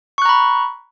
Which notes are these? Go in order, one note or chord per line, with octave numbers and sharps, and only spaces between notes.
A#5 B5 C#6 F#6